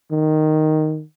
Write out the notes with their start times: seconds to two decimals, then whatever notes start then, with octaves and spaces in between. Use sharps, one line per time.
0.12 D#3